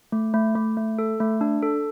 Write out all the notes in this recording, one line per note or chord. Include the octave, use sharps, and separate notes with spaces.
A3
A3
A3
A3
A4
A3
D4
A4